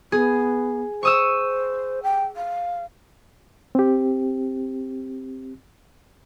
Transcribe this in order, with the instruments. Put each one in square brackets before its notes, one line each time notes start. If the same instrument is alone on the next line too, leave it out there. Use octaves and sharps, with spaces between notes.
[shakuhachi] B3 [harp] G#4
[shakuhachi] C5 [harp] C#6 D#6 E6
[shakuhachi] G5
F5
[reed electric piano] C4 G4